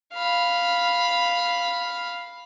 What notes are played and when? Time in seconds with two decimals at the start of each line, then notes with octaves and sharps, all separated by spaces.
0.13 F5 B5